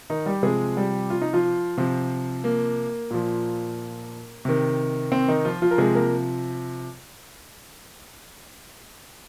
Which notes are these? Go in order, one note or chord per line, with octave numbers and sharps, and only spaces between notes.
D#3 D#4
G3 G4
C3 F3 G#3 G#4
G3 G4
F4
D#4
F3 F4
C3 F3
A#3
A#2 F3
C3 D#3
C4
D#3 D#4
F3 F4
F3 F4
A#4
C3 F3 G#3 G#4
A#3 A#4